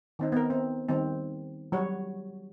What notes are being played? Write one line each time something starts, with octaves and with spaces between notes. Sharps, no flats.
D#3 C4 D#4
B3 A#4
C4
D#3 G3 C4
F#3 G3 F#4 C#5